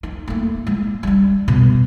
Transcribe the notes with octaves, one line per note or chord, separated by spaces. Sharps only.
D#4
A3 A#3
G#3
G3 D4
B2